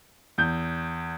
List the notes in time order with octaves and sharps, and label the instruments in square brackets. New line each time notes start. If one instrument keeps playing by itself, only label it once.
[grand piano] E2 G6